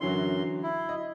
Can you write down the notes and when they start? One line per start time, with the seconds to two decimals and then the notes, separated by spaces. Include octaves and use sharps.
0.01 F#2 D3 E3 F#3 C6
0.63 E4
0.89 D#5